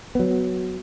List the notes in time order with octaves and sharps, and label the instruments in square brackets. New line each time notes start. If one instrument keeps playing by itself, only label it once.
[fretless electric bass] F#3 B3